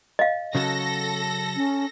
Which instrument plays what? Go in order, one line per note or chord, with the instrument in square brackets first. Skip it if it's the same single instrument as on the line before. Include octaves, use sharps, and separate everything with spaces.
[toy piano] D#5 F5
[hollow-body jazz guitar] C#3 F#3 F#4 [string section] A4 A#6
[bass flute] C#4